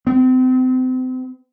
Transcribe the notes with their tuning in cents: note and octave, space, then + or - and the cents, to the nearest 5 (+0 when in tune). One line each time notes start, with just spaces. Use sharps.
C4 -35